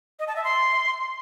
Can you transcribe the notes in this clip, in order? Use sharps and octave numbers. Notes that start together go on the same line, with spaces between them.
D#5
A5
E5
C6